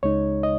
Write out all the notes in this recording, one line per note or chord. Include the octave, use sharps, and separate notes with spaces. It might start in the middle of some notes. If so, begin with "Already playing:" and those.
C#2 C#3 G#3 D#4 C#5
D#5